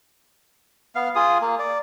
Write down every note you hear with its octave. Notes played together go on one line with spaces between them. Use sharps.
B3 F5
F4 G#4 D#6
A#3
D5